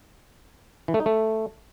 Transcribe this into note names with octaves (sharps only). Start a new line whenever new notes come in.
E3
A3
D#4
A3